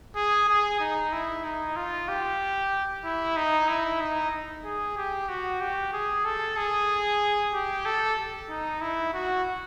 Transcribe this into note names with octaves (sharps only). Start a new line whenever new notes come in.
G#4
G#4
D#4
E4
D#4
F4
G4
E4
D#4
E4
D#4
G#4
G4
F#4
G4
G#4
A4
G#4
G4
A4
D#4
E4
F#4